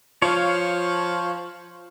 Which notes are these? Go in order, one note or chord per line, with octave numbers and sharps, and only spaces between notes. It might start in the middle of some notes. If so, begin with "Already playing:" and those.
F3 C#5 F5